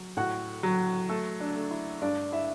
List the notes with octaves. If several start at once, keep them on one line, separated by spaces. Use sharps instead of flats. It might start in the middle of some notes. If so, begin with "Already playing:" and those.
Already playing: F#3
A2 F#4 F#5
F#3
A3 A4
D4
A3
E4
G2 D4 D5
E4 E5